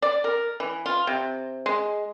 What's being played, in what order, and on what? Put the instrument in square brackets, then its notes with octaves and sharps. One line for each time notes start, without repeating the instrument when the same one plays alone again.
[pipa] D5
A#4
E3
F4
C3
G#3